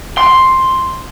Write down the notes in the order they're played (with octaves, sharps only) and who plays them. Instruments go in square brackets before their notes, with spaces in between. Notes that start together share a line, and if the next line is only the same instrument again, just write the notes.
[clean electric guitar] C6